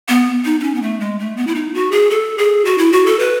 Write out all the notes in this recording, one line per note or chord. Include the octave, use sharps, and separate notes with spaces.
B3
D#4
D#4
C#4
B3
A3
G#3
A3
B3
E4
D#4
F#4
G#4
A4
G#4
F#4
E4
F#4
A4
B4